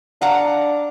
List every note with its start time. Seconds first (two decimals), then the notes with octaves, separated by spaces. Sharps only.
0.21 D4 F5 F#5 A#5